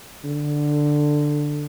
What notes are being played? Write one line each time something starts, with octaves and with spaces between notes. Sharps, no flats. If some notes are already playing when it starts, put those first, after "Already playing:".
D3